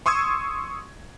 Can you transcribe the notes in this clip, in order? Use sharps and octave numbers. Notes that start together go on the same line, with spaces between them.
C6 C#6 D#6 E6 G#6